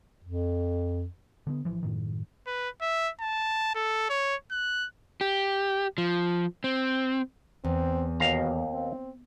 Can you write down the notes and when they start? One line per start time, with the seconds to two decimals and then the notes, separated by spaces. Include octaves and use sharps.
0.24 F2
1.47 D3 A#3 B3
1.65 A1 E3 F3
1.83 F#2 A2 D#3
2.47 B4
2.82 E5
3.21 A5
3.75 A4
4.10 C#5
4.51 F#6
5.21 G4
5.98 F3
6.64 C4
7.65 E2 C4
8.20 D#2 B2 F5 A#5
8.73 C4